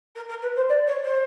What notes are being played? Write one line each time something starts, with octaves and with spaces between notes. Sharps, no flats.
A#4
A#4
B4
C5
D5
C#5
C5